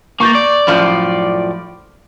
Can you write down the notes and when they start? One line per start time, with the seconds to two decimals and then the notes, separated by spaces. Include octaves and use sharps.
0.20 A#3 C#6 G6 A6
0.35 D5
0.67 F#2 A2 F3